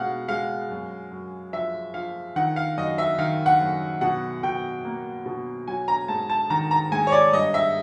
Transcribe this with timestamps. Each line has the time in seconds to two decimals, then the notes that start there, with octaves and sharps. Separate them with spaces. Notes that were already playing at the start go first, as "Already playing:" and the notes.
Already playing: B2 G#3 F5 F#5
0.28 G#3 F5
0.70 F#2
1.11 F#2
1.53 F3 E5
1.94 F3 F5
2.36 D#3 F#5
2.56 F5
2.77 F#2 D#5
2.98 E5
3.18 D#3 F5
3.46 F#5
3.61 F#2
4.01 B2 F#5
4.43 B2 G5
4.84 A#3
5.26 B2
5.67 F#3 G#5
5.88 A#5
6.08 G#2 A5
6.30 A5
6.50 D#3 A#5
6.71 A#5
6.91 G#2 G#5
7.07 C#5
7.12 D5
7.33 G2 D#5
7.54 E5